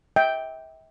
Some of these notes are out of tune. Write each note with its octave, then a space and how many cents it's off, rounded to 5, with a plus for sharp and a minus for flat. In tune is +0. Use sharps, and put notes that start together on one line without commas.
E5 -40 G5 +0